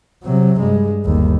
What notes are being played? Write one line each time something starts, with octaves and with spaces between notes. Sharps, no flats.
C3 F#3
G2 G#3
G1 D#2